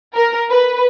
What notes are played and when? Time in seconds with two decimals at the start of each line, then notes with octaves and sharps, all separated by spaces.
0.15 A#4
0.50 B4